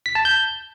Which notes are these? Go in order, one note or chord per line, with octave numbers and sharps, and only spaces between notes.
B6
A5
G6